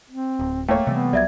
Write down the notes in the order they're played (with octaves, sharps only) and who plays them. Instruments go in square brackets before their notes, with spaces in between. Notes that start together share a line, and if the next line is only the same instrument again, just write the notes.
[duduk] C4
[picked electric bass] D1
[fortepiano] A3 A#3 C#5 [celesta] G5
[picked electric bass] C3 E3 G3 [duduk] B3
[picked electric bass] C2 F#3 G3 [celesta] D5 E5 G#6